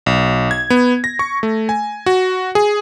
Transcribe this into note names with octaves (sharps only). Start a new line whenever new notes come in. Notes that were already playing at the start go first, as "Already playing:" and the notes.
B1
G#6
B3
A#6
C#6
A3
G#5
F#4
G#4